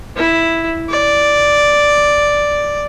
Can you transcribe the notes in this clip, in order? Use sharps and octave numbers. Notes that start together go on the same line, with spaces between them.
E4
D5